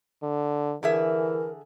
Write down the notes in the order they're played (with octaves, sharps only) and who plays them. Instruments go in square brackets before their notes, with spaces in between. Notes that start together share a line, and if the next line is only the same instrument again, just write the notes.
[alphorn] D3
[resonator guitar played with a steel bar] D3 G#4 E5 [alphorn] E3 [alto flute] A#4